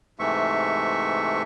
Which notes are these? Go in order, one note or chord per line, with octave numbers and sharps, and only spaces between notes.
G#2 C3 E3 A3 E5 C#6